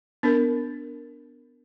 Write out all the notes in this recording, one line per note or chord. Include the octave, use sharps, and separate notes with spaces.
B3 D4 A#4